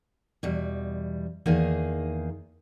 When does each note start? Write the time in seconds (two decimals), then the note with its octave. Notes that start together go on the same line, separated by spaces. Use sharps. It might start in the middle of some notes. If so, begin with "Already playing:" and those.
0.43 E2 B2 G3
1.46 E2 D#3 A#3 D#4 G#4